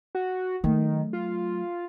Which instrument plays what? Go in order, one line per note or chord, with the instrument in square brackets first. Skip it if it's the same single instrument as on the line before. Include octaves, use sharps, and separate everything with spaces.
[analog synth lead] F#4
[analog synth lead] D#3 [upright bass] F#3 A3
[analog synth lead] F4